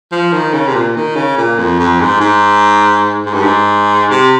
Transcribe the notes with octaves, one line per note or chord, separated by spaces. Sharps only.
F3
D#3
C#3
C3
A#2
D#3
C#3
A#2
F2
F2
G#2
G#2
G#2
G2
G#2
C3